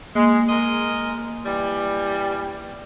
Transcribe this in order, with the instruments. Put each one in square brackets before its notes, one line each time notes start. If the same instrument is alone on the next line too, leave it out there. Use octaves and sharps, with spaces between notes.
[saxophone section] G#3 [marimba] A#3
[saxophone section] G#3 A#4 D#5
E3 G3